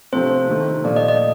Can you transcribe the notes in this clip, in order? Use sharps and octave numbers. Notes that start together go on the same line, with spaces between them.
C3 F3 A3 C4 C5
C3 D#3 A3
A#2 F3 A3 D5
D#5
D#5